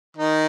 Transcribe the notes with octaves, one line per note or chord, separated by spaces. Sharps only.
D#3 D#4